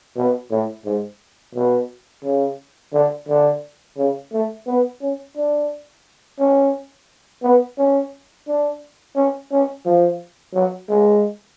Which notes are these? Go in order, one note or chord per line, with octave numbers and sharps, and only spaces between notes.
B2
A2
G#2
B2
C#3
D3
D3
C#3
A3
B3
C#4
D4
C#4
B3
C#4
D4
C#4
C#4
F3
F#3
G#3